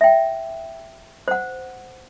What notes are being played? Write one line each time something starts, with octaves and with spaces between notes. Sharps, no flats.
E5 G5
C5 F#5